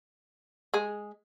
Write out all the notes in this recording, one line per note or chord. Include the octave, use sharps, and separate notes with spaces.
G#3 G#4